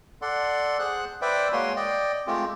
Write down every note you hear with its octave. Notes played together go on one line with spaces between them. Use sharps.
A4 D5 F#5 C6
G#4 C5 F#5 F#6
B4 C5 D5 E5 G5
G#3 A#3 F#4 C#5 G#5 C6
D5 D#5 G5
G#3 A3 C4 F4 G4